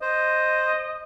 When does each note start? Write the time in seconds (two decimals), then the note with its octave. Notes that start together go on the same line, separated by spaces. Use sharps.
0.02 C5 D#5